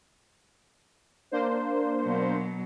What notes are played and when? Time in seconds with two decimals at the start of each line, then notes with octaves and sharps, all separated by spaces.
1.32 A#3 D4 C5
2.03 B2 F#3